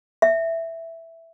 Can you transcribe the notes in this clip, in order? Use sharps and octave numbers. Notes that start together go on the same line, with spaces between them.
E5